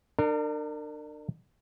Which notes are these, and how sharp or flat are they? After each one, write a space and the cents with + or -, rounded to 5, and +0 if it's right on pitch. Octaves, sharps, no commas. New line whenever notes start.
D4 +30 A#4 -30